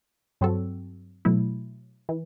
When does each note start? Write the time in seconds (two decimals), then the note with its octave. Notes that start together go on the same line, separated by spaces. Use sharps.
0.41 G2 F#3 C4 F#4 A4
1.25 B2 F#3 A3 E4
2.09 E3